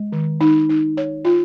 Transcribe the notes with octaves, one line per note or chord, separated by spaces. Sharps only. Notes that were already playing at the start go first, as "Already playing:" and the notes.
Already playing: G#3
D#3
D#4
D#4
C#5
F4